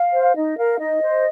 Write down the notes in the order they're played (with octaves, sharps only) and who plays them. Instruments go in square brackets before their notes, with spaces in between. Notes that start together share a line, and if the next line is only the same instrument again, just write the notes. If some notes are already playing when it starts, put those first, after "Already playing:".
Already playing: [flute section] F5
C5
D#4 D#5
A#4 F5
D#4 D#5
C5